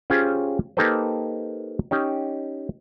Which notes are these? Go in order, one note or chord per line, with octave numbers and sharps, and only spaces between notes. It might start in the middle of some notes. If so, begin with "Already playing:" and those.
C#4 F4 G4 G#4 C5 C#5
A#3 D#4 G4 A4 B4 C5
C#4 D#4 G4